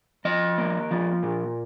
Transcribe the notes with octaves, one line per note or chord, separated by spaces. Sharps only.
F3 D#5
A#3
F3
A#2